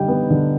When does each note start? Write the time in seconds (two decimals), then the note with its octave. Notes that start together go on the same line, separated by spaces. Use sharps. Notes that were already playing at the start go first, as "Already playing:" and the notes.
Already playing: D3 G3 D#4 G5
0.08 B3
0.30 D3